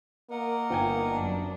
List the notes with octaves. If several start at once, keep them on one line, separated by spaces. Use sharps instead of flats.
A#3 A#4 D#5 F#5
G1 G5 G#5
F#2 D4